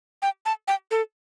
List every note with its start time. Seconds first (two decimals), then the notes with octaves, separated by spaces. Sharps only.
0.22 G5
0.46 A5
0.68 G5
0.91 A4